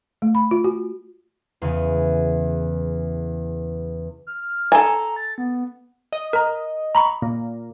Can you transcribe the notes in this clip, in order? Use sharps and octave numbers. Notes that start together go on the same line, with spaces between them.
A3
B5
F4
F#4
E2 C#3 E3
F6
A4 G#5 A#5
A6
B3
D#5
A#4 A#5
A#5 B5 C#6
A#2